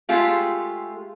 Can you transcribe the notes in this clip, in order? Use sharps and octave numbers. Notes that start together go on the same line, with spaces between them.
G#3 A3 F4 G4